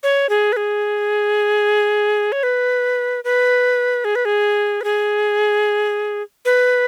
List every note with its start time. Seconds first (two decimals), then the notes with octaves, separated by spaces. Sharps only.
0.03 C#5
0.29 G#4
0.53 B4
0.57 G#4
2.32 C#5
2.43 B4
3.24 B4
4.05 G#4
4.15 B4
4.25 G#4
4.81 B4
4.84 G#4
6.45 B4